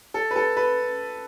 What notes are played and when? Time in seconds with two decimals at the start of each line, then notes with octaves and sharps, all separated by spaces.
0.14 A4
0.31 B4
0.36 A4
0.57 B4